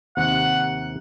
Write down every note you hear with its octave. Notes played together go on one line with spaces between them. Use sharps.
D#2 C3 F#5